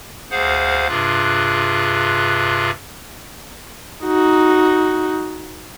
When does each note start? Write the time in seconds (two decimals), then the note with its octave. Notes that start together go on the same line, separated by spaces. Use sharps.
0.31 D2 G#4 C5 F5 F#5
0.88 G2 C3 F4 G#4 F#6
4.06 D#4 F#4